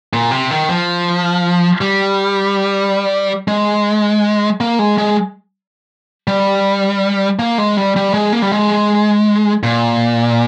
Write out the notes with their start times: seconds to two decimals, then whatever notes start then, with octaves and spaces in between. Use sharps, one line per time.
0.13 A#2
0.31 C3
0.51 D#3
0.69 F3
1.81 G3
3.48 G#3
4.61 A#3
4.79 G#3
4.98 G#3
6.28 G3
7.39 A#3
7.58 G#3
7.77 G3
7.96 G3
8.14 G#3
8.33 A#3
8.42 G3
8.52 G#3
9.63 A#2